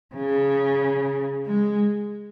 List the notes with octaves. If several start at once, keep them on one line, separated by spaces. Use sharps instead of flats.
C#3
G#3